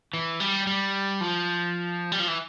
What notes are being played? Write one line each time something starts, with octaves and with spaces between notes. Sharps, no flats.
E3
G3
G3
F3
G3
F3
E3